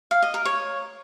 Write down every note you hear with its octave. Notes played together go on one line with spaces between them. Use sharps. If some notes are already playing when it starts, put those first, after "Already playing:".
F5
D#5
A#4
C#5